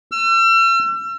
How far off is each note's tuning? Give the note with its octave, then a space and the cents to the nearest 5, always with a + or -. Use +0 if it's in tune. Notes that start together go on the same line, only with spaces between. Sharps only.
E6 +40